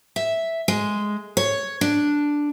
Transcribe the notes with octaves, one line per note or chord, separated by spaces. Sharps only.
E5
G#3
C#5
D4